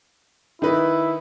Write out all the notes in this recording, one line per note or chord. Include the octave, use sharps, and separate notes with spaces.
D#3 D#4 E4 B4